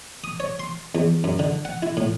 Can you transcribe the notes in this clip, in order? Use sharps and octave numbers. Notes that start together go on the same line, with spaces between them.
D#6
C#5
C6
E2
F#2
D3
F#5
E4
A2